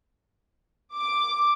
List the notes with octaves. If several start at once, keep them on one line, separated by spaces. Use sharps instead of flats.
D6